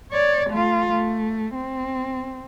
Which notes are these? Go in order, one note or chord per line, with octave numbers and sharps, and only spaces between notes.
C#5 D5
A3 F4
A3
C4